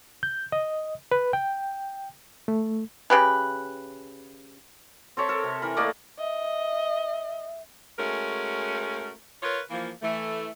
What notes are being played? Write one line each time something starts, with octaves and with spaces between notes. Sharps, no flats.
G6
D#5
B4
G5
A3
C#3 G4 B4
C4 A4 C#5 E5
A4 A#4
C3
E3 A#4 B5
A3 A#3 D5 D#5
D#5 E5
G#3 A3 C#4 F#4 A#4
F4 A#4 B4 C#5
E3 F3 A#3
E3 A3